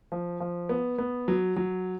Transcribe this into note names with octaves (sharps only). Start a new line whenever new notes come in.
F3
F3
B3
B3
F#3
F#3